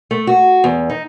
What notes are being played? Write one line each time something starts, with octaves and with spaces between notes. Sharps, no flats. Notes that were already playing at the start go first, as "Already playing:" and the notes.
A3
F#4
E2
D#4